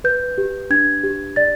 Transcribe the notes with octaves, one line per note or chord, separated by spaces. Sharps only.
B4 G6
G4
D4 G#6
G4
D5 A6